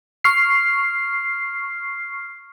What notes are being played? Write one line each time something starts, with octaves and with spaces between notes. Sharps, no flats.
C#6 F6 C7